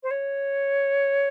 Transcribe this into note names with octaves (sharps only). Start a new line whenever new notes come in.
C5
C#5